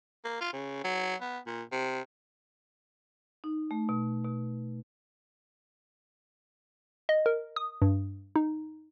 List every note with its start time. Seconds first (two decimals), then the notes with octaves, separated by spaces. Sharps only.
0.24 A#3
0.41 F4
0.53 C#3
0.84 F#3
1.21 B3
1.47 A#2
1.72 C3
3.44 D#4
3.71 A3
3.89 B2
4.24 B2
7.09 D#5
7.26 A#4
7.56 D#6
7.82 G2
8.36 D#4